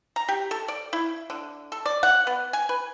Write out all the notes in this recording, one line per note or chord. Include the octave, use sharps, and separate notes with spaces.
A#5
G4
A4
D5
E4
D3
A4
D5
F#5
B3
G#5
B4